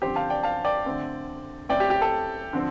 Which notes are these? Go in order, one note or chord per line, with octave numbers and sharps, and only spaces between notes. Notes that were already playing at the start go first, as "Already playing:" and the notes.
D3 F3 C4 G4 C5
F5 A5
D5 G5
F5 A5
D5 G5
D3 A3 C4
A2 A3 C4 D5 G5
G4
G4
A4
D3 F3 C4